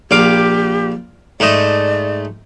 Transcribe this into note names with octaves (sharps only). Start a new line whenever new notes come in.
A#1 G4 F5 D6
G#2 A3 D5 D#5